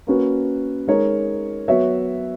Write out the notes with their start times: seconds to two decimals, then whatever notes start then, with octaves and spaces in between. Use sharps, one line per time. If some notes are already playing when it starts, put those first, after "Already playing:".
0.07 A#3 C#4 F#4 B4
0.87 G#3 D#4 A#4 C#5
1.68 F#3 B3 F#4 C#5 E5